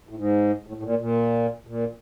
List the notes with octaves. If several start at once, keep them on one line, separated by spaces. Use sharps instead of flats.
A2
G#2
A2
A2
A#2
A#2
A#2